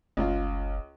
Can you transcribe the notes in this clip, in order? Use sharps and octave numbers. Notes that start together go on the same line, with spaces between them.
F#1 C#2 F4